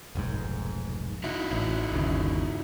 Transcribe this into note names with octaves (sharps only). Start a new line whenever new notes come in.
F1 B1 G#2
D#4 E4 F#4
A1
G1 D#2 C#3